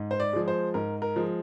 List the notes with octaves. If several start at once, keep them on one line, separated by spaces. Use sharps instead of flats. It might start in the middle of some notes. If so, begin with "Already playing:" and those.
Already playing: G#2
C5
D5
F3 G#3
C5
G#2 A#4
A#4
F3 G#3